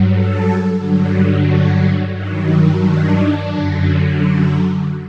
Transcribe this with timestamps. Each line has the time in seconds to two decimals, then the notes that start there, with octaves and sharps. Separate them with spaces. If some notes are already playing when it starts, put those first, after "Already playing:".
Already playing: G2 F#3
0.11 A4
0.78 G2 D3 F#3
1.45 F#4
2.13 G2 D#3 F#3
2.80 D4
3.47 F#2 D3 F#3